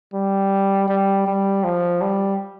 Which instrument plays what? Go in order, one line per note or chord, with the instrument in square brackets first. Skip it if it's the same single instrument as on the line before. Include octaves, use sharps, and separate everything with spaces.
[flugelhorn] G3
G3
G3
F3
G3